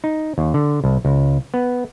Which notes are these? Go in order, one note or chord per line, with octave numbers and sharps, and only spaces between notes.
D#4
D#2
D3
C2
C#2
B3